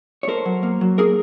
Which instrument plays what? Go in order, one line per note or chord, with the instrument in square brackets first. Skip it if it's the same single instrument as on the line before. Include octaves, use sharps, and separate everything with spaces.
[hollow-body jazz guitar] C#5
A3 A#4 C5
F#3
A#3
F#3
A#3 G#4 A#4